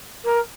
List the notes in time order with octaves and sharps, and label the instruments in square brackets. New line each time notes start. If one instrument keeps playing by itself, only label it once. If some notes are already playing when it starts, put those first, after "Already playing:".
[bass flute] A#4